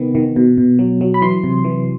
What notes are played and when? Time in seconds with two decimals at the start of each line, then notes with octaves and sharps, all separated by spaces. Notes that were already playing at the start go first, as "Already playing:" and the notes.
Already playing: C3 D#3 B3
0.15 D#3
0.36 B2
0.57 B2
0.79 F#3
1.01 F#3
1.14 B5
1.22 E3 C6
1.44 C3
1.64 E3